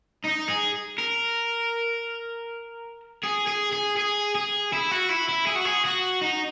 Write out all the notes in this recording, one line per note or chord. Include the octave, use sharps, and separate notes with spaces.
D#4
G#4
A#4
G#4
G#4
G#4
G#4
G#4
E4
F#4
E4
E4
G#4
F#4
G#4
F#4
D#4